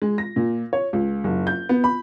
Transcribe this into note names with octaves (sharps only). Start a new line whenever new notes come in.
G#3
A#6
A#2
C#5
C#2
F#1
G6
B3
B5